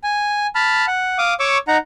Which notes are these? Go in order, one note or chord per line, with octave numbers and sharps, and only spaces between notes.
G#5
A5 B5 F6
F#5
F5 D6 D#6
C#5 C#6 D6 E6
D#4 F#5 A#5